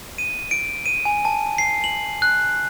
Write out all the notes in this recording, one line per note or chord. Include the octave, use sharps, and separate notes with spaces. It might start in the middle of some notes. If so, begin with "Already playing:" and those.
D#7
D7
D#7
G#5
A5
C7
F#7
F#6